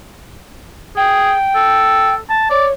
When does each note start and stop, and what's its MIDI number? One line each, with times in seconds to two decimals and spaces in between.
0.96 1.32 68
0.96 2.14 79
1.55 2.17 69
2.30 2.48 81
2.50 2.72 73
2.50 2.66 74